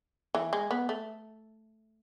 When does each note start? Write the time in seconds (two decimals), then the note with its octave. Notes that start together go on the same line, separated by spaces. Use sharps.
0.35 E3
0.53 G#3
0.71 B3
0.89 A3